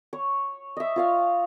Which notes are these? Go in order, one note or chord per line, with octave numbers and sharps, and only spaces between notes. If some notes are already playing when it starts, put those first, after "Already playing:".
C#5
D#5 E5
F4 C#5 F5